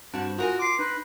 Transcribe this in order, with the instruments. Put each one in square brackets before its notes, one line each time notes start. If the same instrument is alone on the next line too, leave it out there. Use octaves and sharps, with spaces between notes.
[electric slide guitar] G2 C4 A5 [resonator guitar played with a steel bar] F#4 F#5
[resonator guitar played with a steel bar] D#4 A#4 G#5 [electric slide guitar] F4 [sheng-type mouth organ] F#4
[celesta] C6 C7 [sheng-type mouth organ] D6
[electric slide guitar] D#4 [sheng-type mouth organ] B4